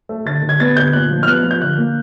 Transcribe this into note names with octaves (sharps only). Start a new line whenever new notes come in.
A3
D3 A6
D3
G#6
B3 A6
D3 G6
A#2 F#6
F3
F6
B3 F#6
F3
G6
D3 F#6
A#3